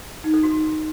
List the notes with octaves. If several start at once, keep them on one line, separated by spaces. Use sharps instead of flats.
D#4
A4
F#4